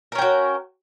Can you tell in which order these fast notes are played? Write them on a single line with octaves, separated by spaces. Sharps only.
A#4 C#4 G5 F#4